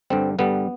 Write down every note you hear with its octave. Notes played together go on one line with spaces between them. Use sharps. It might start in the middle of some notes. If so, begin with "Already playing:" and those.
G2 D3 G3 C4
G2 D3 G3 B3